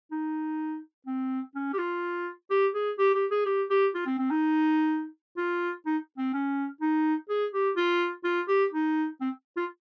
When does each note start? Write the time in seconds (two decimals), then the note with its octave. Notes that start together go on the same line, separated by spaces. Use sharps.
0.11 D#4
1.07 C4
1.55 C#4
1.73 G4
1.78 F4
2.50 G4
2.74 G#4
2.98 G4
3.14 G4
3.31 G#4
3.46 G4
3.70 G4
3.95 F4
4.06 C4
4.19 C4
4.31 D#4
5.37 F4
5.86 D#4
6.18 C4
6.34 C#4
6.81 D#4
7.29 G#4
7.53 G4
7.76 F4
8.24 F4
8.48 G4
8.73 D#4
9.21 C4
9.56 F4